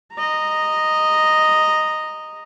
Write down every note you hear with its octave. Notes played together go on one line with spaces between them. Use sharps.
D#5 A#5